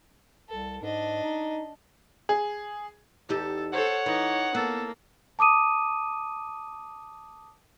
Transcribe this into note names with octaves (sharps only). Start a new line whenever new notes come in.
C2 A4
G#2 D4 D#5
D#4
G#4
E2 D#4 G4 A4
A4 C5 C#5 F#5
E3 D#4
A#3 B3 A4
A5 D6 D#6 D#7